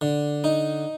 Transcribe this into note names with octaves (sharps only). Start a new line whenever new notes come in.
D3
D#4